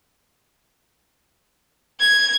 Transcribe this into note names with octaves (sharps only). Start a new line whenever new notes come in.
G#6